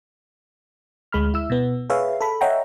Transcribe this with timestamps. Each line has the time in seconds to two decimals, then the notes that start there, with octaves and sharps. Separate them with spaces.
1.12 D2 G#3 B5 F6
1.34 E4 E6
1.50 B2 B3
1.90 G#4 B4 C#5 E5 F5
2.21 A4 B5
2.41 C#5 D#5 E5 F#5 G5 A#5